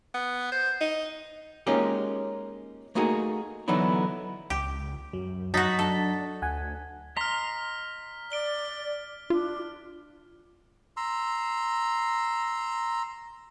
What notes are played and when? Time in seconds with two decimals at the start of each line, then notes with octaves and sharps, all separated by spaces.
0.14 B3
0.52 C5
0.81 D#4
1.67 G#3 A#3 C#4 D#4 F4 G4
2.95 A3 A#3 D#4 F#4 G#4
3.68 D3 E3 F#3 B3 D#4 E4
4.50 C#2 G4
5.13 F#2 F#3
5.54 F#3 D#4 F#4 A6 B6
5.79 D4 A4
6.42 D2 F#5 G#5
7.17 D#5 A#5 C6 F6 B6
8.32 D5 D7 G7
9.30 D4 F4
10.97 A#5 C6 E6